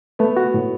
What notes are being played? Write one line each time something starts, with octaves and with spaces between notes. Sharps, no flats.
A3 B3
F#4
A2